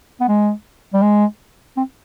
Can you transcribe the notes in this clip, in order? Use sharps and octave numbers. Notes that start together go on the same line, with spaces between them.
B3
G#3
G3
G#3
C4